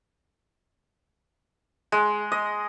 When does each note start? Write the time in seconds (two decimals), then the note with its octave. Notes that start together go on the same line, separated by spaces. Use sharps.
1.92 G#3
2.32 D#5